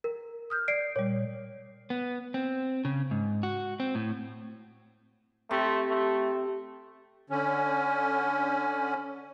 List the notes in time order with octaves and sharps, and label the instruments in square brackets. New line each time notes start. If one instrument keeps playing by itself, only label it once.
[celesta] A#4
[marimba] D#6 F6 G6
[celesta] D5 C7 D7
[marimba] A#2 G3 [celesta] C#5
[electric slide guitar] B3
C4
C#3
G#2
F#4
C4
A2
[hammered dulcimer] C3 [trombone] A3
[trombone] A3
[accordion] D3 C#4